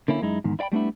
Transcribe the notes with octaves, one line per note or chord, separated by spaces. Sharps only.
D3 A#3 C#4 E4
F#2 G#3 D#4 E4
E2 G#2 D#3
E4 D5 F5 G5 B5
G3 A3 B3 D4 E4